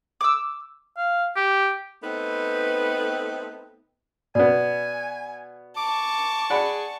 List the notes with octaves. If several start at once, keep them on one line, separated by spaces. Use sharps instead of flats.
D6 E6
F5
G4
A3 B3 C4 D#4 B4
B2 B3 D5 G#5
A5 C#6 D6
G#4 D5 F#5 B5